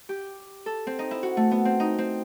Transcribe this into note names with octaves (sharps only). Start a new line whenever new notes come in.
G4
A4
C4
D#4
E4
F#4
A3
B3
C4
D#4
C4